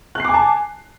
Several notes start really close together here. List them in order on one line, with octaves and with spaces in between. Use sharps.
F#6 C7 D6 G#5 A5